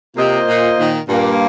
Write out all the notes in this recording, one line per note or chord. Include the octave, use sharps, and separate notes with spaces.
C3 A#3 F4 C5 D#5
A#2
A#2 D#3
G2 A#2 G3 A#3